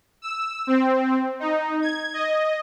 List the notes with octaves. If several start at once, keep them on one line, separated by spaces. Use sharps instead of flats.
E6
C4
D#4
G#6
D#5